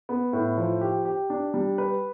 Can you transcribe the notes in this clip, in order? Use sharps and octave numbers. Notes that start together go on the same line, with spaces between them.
B3
A2
F3
G4
G4
D4
G3
B4